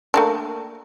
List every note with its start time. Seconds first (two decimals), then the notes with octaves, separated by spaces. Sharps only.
0.14 A3 A#3 D4